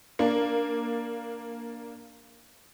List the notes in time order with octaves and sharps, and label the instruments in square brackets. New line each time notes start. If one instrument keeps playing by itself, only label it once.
[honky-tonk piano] A#3 D4